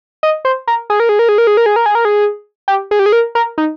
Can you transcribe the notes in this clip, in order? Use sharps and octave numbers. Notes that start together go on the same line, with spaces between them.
D#5
C5
A#4
G#4
A#4
G#4
A#4
G#4
A#4
G#4
A#4
G#4
A#4
G#4
A#4
G#4
G4
G#4
G4
G#4
A#4
A#4
D#4